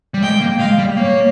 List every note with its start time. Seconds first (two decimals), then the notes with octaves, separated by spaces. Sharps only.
0.14 G3
0.23 G#3 G5
0.41 A#3
0.59 G#3 F5
0.78 G3
0.97 A#3 C#5